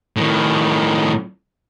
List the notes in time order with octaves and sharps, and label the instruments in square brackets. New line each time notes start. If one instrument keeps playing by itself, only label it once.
[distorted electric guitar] A2 D#3